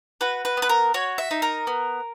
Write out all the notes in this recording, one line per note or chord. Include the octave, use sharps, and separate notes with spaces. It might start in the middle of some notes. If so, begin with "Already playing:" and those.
F#4 B4
B4
B3
B4
A#4
F#4 C#5
E5
D#4
A#4
B3